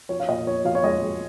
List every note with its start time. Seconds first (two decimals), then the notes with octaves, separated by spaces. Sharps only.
0.09 F3 C#5
0.20 F5
0.29 A#2 D#5
0.46 F3 C#5
0.65 F3 F5
0.75 C#5
0.84 G#3 D#5
1.03 G#3